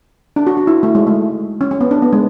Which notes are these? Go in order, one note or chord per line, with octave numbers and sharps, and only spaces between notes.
D4
F#4
F#4
E4
A3
G#3
A3
C#4
C#4
B3
D4
B3
G#3